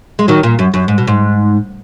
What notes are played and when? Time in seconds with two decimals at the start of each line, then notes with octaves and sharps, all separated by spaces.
0.19 G#3
0.28 D#3 F#3
0.43 A#2
0.59 F#2
0.74 F#2
0.88 G#2
0.98 B2
1.07 G#2